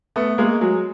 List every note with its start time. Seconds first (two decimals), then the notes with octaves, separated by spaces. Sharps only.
0.16 A3 B3
0.38 G#3 A#3
0.61 F#3 G#3